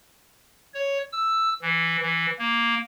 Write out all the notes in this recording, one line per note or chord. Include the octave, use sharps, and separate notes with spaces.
C#5
E6
E3
E3
A#3